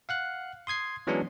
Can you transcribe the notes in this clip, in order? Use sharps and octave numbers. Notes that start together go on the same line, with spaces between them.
F5 F#5 F#6
C6 D#6 G#6 C7
E3 F#3 G#3 B3 C#4 D4